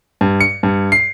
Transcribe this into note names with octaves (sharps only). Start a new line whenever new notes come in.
G2
C#7
G2
C7